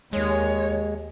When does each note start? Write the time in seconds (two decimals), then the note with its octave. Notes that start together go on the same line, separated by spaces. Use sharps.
0.13 D#2 G#3 C#5